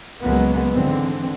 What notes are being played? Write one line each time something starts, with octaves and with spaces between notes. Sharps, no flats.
C#2 F#3 G#3 A#3 B3
G#2 D3 E3 C4